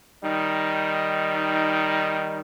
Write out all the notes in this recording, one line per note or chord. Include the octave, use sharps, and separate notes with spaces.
D#3 G3 D#4